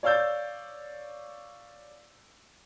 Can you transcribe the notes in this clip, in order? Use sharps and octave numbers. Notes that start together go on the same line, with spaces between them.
C#5 D5 F5 E6 G6 A6